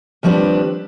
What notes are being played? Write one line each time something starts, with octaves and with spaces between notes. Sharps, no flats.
D#2 F3 G3 C4 D4 B4